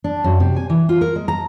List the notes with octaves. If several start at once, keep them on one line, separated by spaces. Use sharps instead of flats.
D4
F#2
C3
G#5
E3
F4
A#4
G#3
A#5